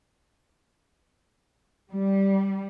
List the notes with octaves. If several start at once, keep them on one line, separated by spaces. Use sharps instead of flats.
G3